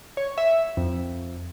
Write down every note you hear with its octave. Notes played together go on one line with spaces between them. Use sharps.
C#5
E5
F2